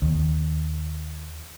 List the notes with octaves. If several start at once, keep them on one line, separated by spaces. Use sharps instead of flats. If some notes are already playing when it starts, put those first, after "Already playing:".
D#2